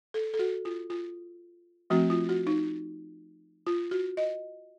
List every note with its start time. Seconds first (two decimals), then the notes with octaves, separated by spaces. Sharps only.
0.14 A4
0.34 A4
0.39 F#4
0.65 F4
0.90 F4
1.90 F3 A3 C4 F#4
2.10 F4
2.29 F#4
2.47 D#4
3.67 F4
3.91 F#4
4.17 D#5